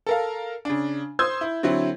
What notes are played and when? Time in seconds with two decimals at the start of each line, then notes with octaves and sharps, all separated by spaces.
0.07 A4 A#4 F5
0.65 C#3 D4
1.19 C5 C6 D#6 E6 G6 G#6
1.41 E4
1.63 D3 F#3 C4 E4